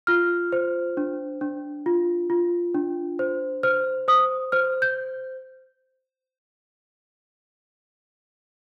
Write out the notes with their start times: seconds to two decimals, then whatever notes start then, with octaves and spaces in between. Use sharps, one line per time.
0.07 F4 F6
0.53 C5
0.97 D4
1.41 D4
1.86 F4
2.30 F4
2.75 D4
3.19 C5
3.63 C5 F6
4.08 C5 D#6
4.52 C5 F6
4.82 G6